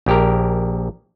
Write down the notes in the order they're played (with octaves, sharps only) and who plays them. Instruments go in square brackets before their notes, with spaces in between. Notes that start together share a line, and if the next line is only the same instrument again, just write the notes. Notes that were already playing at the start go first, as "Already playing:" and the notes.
[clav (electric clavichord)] A#1 G4 A#4